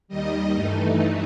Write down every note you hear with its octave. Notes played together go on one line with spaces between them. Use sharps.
D#2 D#3 G3 D#5
G2 E3 A3 D#4